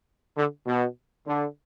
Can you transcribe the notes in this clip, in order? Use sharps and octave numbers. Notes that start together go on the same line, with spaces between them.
D3
B2
D3